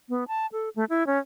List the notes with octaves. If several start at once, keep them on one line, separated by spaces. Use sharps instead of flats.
B3
A5
A4
A3
E4
C#4